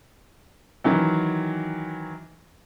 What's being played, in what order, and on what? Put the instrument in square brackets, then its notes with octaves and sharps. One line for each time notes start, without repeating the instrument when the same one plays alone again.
[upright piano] D#3 E3 F#3